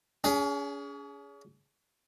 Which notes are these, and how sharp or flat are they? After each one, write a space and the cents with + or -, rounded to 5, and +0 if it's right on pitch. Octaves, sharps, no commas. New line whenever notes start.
C#4 +40 G#4 +0